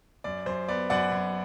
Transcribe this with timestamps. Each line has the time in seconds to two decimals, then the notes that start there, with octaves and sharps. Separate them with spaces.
0.24 F#2 D5
0.46 F#2 C5
0.68 B3 D5
0.90 F#2 D5 F#5
1.12 F#2